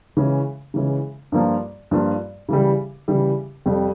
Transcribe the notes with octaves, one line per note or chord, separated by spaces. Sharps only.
C#3 E3 G#3 C#4
C#3 E3 G#3 C#4
G2 F3 A#3 F4
G2 F3 A#3 F4
C#3 E3 G3
C#3 E3 G3
F2 C3 G3